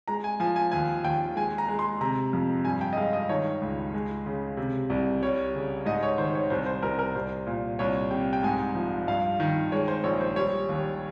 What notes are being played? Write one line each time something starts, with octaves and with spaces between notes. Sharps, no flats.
G#3 A#5
G#5
F3 G#5
G#5
D#2 G#5
D#2 G5
G#3 G#5
A#5
G#3
C6
C3 A#5
F2
G2 G#5
G5
D#5
G#3 F5
D#5
D#3 C#5
C#2
G#3
C#3
C3
C2
G3 C#5
C#3
G#2 D#5
C#5
D#3 C5
C#5
C2 C5
C5
C2 A#4
A#4
C2 C5
A#2
C2 C#5
C3 G5
G5
G#2 G#5
F3
G2 F5
D#3
G#3 C#5
C5
A#1 C#5
C5
G3 C#5
D#2